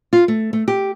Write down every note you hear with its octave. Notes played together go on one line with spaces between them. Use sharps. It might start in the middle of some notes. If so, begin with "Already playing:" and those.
F4
A3
A3
G4